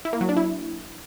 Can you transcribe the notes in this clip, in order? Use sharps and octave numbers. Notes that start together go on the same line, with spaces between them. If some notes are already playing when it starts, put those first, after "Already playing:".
E4
A#3
F#3
D4
E4